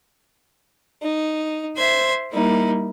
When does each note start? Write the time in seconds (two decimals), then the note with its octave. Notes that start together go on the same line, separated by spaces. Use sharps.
1.03 D#4
1.76 C5 E5 C6 G#6
2.31 G3 A#3 D#4 E4